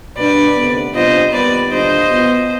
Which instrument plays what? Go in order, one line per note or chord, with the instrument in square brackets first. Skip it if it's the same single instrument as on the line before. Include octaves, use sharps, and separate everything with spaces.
[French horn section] B2 G3 B3 D4 [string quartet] B4 D5
[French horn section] D2 C3 D#3 B3
[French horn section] C3 G3 B3 D4 F4 [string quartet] C5 D#5
[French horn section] D#2 D#3 G3 B3 [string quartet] B4 D5
[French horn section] D#2 D3 G3 D4 F4 [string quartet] C5 D#5
[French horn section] B2 B3 F4